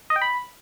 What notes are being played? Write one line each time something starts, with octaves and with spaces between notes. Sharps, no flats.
D#5
G5
B5